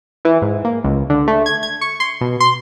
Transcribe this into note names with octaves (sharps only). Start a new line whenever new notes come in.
E3
G#2
A#3
C#2
D3
A3
G#6
G#6
C#6
C6
B2
C6